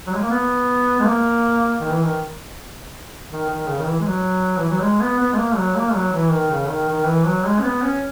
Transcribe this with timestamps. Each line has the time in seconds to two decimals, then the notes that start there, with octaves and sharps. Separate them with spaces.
0.07 F#3
0.14 G#3
0.21 A#3
0.30 B3
1.00 G#3
1.06 A#3
1.80 D#3
1.91 E3
2.03 D#3
3.31 D#3
3.50 D#3
3.68 C#3
3.79 D#3
3.87 E3
4.00 G#3
4.07 F#3
4.57 E3
4.70 F#3
4.82 G#3
5.01 B3
5.19 B3
5.33 G#3
5.37 A#3
5.56 F#3
5.76 A#3
5.94 F#3
6.13 E3
6.31 D#3
6.51 C#3
6.69 D#3
6.89 D#3
7.06 E3
7.26 F#3
7.45 G#3
7.59 C#4
7.63 B3
7.83 C#4